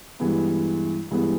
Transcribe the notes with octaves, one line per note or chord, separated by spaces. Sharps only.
G2 E3 G#3 B3
G2 E3 G#3 B3